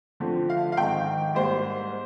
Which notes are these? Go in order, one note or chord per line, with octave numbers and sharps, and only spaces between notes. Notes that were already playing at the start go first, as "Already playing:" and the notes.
D3 F3 C4
F5
F5
G#2 D#3 G#3 C4 G5
G#2 G3 A#3 C5